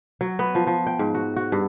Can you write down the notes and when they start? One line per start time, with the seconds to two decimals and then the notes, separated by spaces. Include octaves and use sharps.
0.21 F#3
0.39 B3
0.55 F3
0.67 F3
0.87 G5
0.99 G#2
1.15 F#4
1.36 F#4
1.52 G2